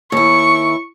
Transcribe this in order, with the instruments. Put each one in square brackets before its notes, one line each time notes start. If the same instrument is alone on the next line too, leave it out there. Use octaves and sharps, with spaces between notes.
[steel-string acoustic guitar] D#2 E4 [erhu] C#6